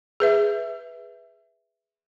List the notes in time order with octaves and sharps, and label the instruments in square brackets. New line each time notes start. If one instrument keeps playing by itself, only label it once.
[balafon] G#4 B4 E5